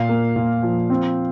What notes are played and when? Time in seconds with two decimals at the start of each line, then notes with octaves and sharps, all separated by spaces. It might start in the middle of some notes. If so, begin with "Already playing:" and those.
Already playing: A#2 F5
0.09 A#3
0.36 A#2
0.63 F3
0.90 C4